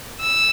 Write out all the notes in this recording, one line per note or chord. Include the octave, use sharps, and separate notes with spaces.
E6